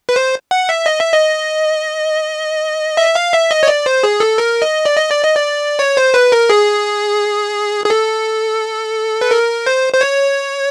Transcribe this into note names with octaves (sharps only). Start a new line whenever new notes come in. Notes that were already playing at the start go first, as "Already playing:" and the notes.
B4
C5
F#5
E5
D#5
E5
D#5
E5
F5
E5
D#5
C#5
D5
C5
G#4
A4
A#4
D#5
D5
D#5
D5
D#5
D5
C#5
C5
B4
A#4
G#4
G#4
A4
B4
A#4
C5
C5
C#5